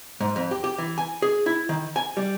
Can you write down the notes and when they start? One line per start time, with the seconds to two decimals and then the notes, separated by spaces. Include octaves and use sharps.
0.21 G#2
0.36 F2
0.51 G4
0.64 G4
0.78 E3
0.98 G#5
1.22 G#4
1.46 E4
1.69 D#3
1.96 G#5
2.17 G3